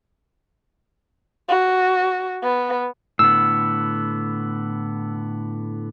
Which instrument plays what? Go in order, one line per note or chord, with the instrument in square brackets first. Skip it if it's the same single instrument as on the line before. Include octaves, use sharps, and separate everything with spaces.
[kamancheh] F#4
B3
[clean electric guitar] A2 D3 B3 [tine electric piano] E6